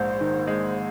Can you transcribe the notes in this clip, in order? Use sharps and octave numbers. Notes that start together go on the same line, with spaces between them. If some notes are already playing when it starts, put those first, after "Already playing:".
Already playing: A#1 G#2 G#3 C5
D#3
G#3